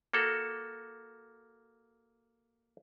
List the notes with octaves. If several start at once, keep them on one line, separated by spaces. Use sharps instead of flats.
A#3 F#4 A4